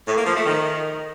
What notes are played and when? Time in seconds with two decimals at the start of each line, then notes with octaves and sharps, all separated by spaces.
0.06 A2
0.16 A#3
0.25 F3
0.35 A3
0.45 D#3